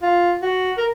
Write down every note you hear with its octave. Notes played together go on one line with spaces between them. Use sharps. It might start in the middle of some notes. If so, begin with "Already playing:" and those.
F4
F#4
A#4